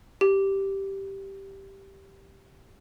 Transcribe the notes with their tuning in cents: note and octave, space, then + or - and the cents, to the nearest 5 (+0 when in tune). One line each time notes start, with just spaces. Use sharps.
G4 -5